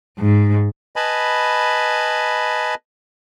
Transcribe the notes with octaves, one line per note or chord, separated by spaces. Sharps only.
G#2
B4 D#5 G#5 A5 B5